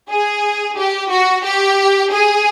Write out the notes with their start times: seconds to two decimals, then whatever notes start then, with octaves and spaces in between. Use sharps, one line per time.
0.10 G#4
0.78 G4
1.11 F#4
1.44 G4
2.11 G#4